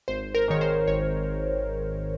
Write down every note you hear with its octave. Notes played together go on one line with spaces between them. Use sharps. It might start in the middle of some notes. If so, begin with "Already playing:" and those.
G#1 C5
A#4
G#2 D#3 C#5
C5
G#1 C#5